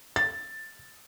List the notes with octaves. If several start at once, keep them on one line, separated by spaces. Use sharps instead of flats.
A6